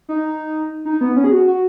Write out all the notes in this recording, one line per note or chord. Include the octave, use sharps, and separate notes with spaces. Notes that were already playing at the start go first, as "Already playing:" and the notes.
D#4
D#4
B3
C#4
G#4
F#4
F#4